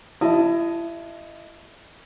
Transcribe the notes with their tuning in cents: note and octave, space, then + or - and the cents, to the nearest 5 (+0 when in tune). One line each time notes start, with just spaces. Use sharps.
E4 +30 D#5 +0 A5 +0